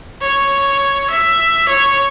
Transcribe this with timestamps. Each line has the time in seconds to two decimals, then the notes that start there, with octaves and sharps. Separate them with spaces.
0.22 C#5
1.10 E5
1.69 C#5